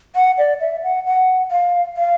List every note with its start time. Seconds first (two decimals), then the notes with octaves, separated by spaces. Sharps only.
0.15 F#5
0.38 D5
0.60 E5
0.84 F#5
1.07 F#5
1.51 F5
1.97 F5